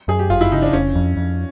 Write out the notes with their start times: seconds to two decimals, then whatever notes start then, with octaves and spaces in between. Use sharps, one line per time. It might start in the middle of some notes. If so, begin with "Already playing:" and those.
0.08 F#2 G#4
0.19 G4
0.30 G1 F4
0.41 E4
0.52 C#3 D#4
0.62 D4
0.73 F1 C#4
0.95 F2
1.17 F2